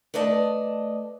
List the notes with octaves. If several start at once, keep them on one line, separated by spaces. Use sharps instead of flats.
A3 B4 D5 D#5 A5